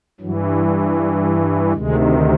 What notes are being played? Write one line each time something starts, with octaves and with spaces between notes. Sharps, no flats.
G2 E3 F#3
G3
G3
G3
D2 C3 D#3 G#3